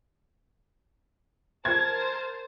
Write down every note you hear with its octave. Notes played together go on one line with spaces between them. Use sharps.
A#4 C5 A5 G#6